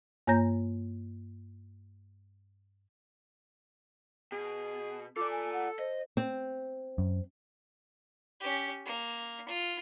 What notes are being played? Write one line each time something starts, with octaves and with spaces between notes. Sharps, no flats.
G2 A#3 C#5 A#5 G6 A#6
B2 G#4
F4 A4 D5 D6
G#5
F#5
C5 D#5
C4
F#2
C#4 G4
A#3
F4